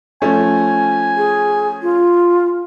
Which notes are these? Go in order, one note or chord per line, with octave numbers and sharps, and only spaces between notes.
F3 A3 C#4 G#5
G#4
F4